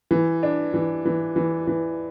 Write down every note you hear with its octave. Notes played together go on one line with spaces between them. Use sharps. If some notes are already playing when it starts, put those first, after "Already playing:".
E3
D4
E3
E3
E3
E3